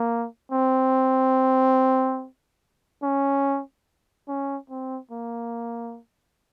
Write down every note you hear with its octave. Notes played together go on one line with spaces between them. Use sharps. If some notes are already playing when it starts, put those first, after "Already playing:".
Already playing: A#3
C4
C#4
C#4
C4
A#3